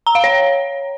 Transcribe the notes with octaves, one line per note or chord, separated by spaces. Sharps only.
A#5
F5
C#5